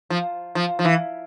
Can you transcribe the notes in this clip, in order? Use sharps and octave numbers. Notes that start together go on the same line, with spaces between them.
F3
F3
F3
E3